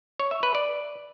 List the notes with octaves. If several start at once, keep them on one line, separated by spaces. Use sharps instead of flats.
C#5
E5
B4
D5